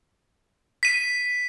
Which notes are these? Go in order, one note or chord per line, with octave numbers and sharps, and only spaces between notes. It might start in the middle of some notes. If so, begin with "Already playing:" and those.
B6 D#7